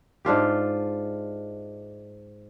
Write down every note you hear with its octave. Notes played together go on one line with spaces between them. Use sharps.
G#2 D4 F4 G4